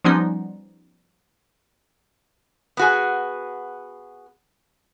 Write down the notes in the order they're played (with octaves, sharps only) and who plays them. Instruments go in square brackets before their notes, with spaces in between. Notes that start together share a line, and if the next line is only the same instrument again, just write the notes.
[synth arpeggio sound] F3 G3 B3 C#4 D#4
[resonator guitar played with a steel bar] B3 F#4 G#4